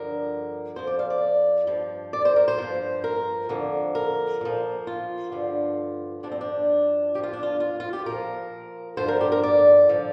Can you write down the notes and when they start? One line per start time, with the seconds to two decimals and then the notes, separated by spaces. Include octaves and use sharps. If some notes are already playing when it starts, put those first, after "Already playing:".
Already playing: G2 D3 F3 A#4
0.76 F2 F3 C5
0.87 D5
0.99 F5
1.10 D5
1.67 G2 F3
2.13 D5
2.25 C5
2.36 A#4
2.48 C5
2.58 G2 F3
3.04 A#4
3.49 F2 D3 F3
3.95 A#4
4.41 A#2 F3
4.87 F4
5.32 G2 D3 F3
6.23 G2 F3 D4
6.32 C4
6.41 D4
7.15 G2 F3 G4
7.23 F4
7.33 D4
7.43 F4
7.60 F4
7.80 F4
7.93 G4
8.06 A#2 F3 A#4
8.97 G2 D3 F3 C5
9.08 A#4
9.21 G4
9.32 A#4
9.43 D5
9.89 D3 F3